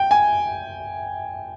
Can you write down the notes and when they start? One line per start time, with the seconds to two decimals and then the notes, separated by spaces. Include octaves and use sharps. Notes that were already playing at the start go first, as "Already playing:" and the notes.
Already playing: G5
0.11 G#5